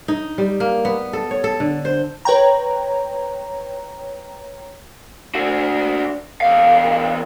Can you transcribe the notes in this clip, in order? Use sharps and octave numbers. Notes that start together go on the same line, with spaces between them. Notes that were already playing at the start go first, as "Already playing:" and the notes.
D#4
G3
A#3
B3
A4
C#5
A4
D3
C5
B4 C#5 G5 A#5
D4 F#4
E2 F5